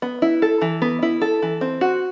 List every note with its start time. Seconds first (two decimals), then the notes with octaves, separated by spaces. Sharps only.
0.02 B3
0.22 E4
0.42 A4
0.62 E3
0.82 B3
1.02 E4
1.22 A4
1.42 E3
1.61 C4
1.81 F#4